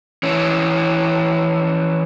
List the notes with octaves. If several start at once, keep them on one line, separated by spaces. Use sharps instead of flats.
E3 C#4